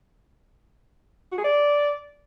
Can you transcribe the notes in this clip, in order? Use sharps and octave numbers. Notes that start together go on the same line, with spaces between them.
F#4
G#4
D5